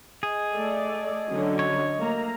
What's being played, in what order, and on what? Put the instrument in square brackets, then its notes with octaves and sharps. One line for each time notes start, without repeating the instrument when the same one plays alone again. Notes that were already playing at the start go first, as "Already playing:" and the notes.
[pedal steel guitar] G#4 [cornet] D#5
[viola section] A3 A4 D5
D3 F#3 C#4
[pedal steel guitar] C#5
[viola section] A3 A#3 A#5